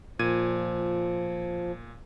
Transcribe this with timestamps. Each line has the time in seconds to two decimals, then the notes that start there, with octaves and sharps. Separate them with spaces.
0.19 A#2 F3 G#6 D#7